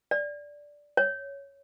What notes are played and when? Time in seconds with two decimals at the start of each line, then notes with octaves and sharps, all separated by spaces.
0.11 D5
0.97 C#5